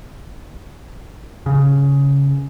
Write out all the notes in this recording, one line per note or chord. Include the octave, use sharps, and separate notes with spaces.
C#3